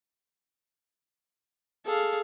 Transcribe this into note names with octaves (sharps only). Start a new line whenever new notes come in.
G#4 A4 F5